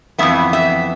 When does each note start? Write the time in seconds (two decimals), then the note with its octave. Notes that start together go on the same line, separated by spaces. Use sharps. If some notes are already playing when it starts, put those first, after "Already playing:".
0.18 F2 E3 G#3 B3 E5
0.53 E5